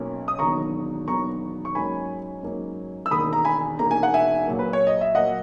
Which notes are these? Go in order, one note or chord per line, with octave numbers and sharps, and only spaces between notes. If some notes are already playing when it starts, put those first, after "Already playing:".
Already playing: B1 B2 A#3 C#4
D#6
E1 D#2 D#3 F#3 B3 A#5 C#6
E1 D#2 D#3 F#3 B3 A#5 C#6
C#6
G#2 F#3 A#3 C#4 G#5 B5
G#2 F#3 A#3 C#4
E6
E1 D#2 D#3 A#3 B5 D#6
A#5
G#5 B5
E1 D#2 D#3 A#3 A#5
G#5
F#5
E5 G#5
A#2 F#3 A#3
B4
C#5
D#5
E5
A#2 F#3 A#3 D#5 F#5